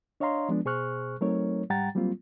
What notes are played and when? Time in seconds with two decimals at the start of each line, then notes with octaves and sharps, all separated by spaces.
0.20 D4 C#5 D#5 F5 A#5 C6
0.49 F3 G#3 B3 D4
0.65 B2 G#4 C5 C#6 F6 F#6
1.21 F#3 A3 C4 D#4 A#4 C#5
1.70 G#2 G3 F#5 G5 A#5 A6
1.95 F#3 G3 A#3 C4 F4